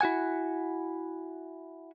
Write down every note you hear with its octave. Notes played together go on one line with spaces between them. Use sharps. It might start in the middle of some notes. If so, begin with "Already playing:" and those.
E4 F#4 F#5 G#5